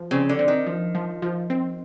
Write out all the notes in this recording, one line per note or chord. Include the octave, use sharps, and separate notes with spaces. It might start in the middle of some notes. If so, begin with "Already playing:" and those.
Already playing: F3
C#3 C4
D3
C4
D#3
F3
F3
F3
C4